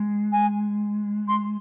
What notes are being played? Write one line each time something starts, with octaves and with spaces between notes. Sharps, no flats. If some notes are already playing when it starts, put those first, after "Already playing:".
Already playing: G#3
G#5
C6